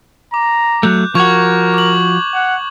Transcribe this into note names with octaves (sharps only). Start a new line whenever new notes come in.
A#5 D6
F#3 A3 F#6 G6
F3 F#4 A#4 C#6 G#6 F7
D6 F#7
F#5